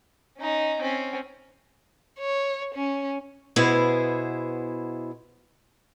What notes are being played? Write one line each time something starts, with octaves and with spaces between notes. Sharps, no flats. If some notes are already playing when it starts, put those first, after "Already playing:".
C#4 D#4
C4 C#4
C#5
C#4
B2 B3 E4 G#4 C5